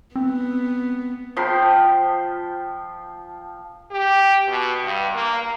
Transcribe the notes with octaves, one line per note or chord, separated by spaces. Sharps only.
B3 C4
F3 G5 B5 C6
G4
B2
G2
A#3